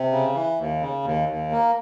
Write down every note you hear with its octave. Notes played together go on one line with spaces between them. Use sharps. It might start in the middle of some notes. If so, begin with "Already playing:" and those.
Already playing: C3
C#3
E3
D#2
C#3
D#2
D#2
A#3